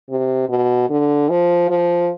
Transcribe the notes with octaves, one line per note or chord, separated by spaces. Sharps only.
C3
B2
D3
F3
F3